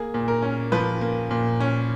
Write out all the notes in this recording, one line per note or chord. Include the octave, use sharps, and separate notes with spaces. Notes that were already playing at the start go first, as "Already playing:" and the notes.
Already playing: A#3 G#4
A#2
A#4
C#4
F3 B4
A#3
A#2
C#4